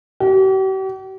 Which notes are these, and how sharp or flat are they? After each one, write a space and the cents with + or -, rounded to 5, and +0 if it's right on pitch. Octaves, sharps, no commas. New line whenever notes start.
G4 -45